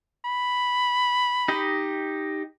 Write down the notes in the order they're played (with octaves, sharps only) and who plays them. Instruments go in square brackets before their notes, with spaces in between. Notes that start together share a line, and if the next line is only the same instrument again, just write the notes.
[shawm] B5
[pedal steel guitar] D#4 G4 D#5